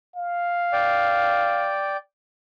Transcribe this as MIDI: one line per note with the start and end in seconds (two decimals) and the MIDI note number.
0.16 1.78 77
0.73 1.97 74
0.73 1.97 79